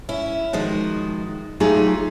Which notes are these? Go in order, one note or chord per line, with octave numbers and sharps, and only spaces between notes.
C#4 E4
D#3 F3 G#3 F#4
F#3 A3 D#4 F4 G4 G#4